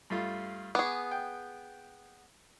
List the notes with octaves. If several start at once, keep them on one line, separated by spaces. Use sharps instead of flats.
G2 A3 F4
B3 G#4 C#6 D6
G5